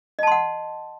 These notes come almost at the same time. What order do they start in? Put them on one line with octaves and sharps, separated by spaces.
D#5 A5 C6 F#5